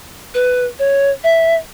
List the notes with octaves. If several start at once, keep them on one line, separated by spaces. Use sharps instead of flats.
B4
C#5
E5